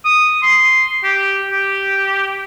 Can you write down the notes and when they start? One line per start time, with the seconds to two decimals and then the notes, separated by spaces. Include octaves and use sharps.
0.05 D#6
0.43 C6
1.04 G4
1.50 G4